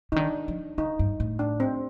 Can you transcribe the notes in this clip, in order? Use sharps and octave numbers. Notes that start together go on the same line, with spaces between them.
D3 D#4
D#3 D4
F3
D3 D#4
G2
A2
D4
C4